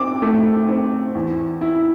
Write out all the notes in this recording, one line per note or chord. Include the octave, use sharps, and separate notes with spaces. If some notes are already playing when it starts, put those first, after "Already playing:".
Already playing: C4 D6
A3
C4
E2
E4